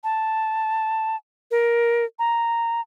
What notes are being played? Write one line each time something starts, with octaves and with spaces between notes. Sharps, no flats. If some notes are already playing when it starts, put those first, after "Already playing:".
A5
A#4
A#5